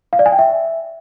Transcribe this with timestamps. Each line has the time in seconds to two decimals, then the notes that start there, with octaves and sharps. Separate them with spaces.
0.13 F5
0.19 D5
0.26 G#5
0.32 G5
0.39 E5